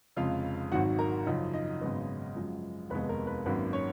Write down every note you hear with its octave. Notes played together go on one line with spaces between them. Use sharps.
F1 F2 C#3 G#3 F4 F5
G#1 G#2 D#3 F#3 F#4 F#5
A#4 A#5
F#2 C#3 F3 D#4 D#5
D#4 D#5
G#1 F#2 C#3 G#3 B3
F#2 F3 G#3
F1 D#2 D#3 G#3 B3 B4
A#4
B4
G#1 F#2 D#3 A#3 B4
C#4 C#5